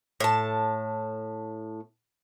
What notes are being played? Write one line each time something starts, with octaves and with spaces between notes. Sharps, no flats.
A2 A5